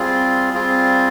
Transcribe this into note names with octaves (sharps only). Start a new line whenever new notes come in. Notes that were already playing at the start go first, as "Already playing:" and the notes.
Already playing: G3 C4 F4 G#4
G3 C4 F4 G#4